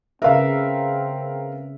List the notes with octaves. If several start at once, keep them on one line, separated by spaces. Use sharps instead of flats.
C#3 C4 A#4 B4 E5 F5